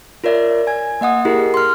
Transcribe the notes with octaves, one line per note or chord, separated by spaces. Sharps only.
F4 A#4 C#5 D5 E5
G#5 G#6
A#3 D#5 F#5 D#6
E4 G4 G#4 A#4 C7 C#7
C6 F6